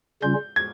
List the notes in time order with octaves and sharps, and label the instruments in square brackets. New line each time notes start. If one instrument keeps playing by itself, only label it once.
[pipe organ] C#3 G3 C#4 F4 [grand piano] G6
[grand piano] G#6